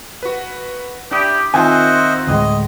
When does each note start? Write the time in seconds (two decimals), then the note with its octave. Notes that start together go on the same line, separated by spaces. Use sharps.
0.23 F#4 B4
1.11 D4 E4 G4 D#6
1.54 D#3 C4 F4 F#4 C5 D#5 E5 G#5
2.27 D2 A2 G#3 D#5